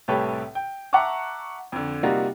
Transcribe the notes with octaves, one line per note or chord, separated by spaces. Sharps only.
C2 A2 G4 A4 B4 C#5
G5
E5 F#5 A5 A#5 C#6 D6
F2 D3
C3 G3 A#3 D#4 F4 F#4